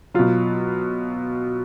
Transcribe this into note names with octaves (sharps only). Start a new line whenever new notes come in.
B2 F#3 F4